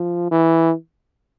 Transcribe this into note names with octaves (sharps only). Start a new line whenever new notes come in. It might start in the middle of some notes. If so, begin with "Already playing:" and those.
Already playing: F3
E3